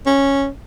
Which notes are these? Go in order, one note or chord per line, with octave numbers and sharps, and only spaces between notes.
C#4